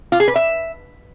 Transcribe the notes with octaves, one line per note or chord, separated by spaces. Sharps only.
F4
G#4
B4
E5